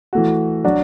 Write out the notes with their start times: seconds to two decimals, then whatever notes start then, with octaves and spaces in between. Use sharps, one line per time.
0.13 E3 A3 F#4
0.64 F#3 D4 F#4